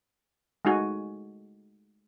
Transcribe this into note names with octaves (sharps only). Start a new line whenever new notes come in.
G#3 A3 D#4 F#4 G#5